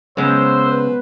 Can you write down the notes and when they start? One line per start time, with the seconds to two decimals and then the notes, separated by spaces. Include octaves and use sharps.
0.17 C#3 G#3 B3 C5 E6
0.66 B4